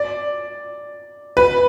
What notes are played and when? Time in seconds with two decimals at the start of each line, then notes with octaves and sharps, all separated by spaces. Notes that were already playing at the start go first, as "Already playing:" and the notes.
Already playing: D5
1.37 B4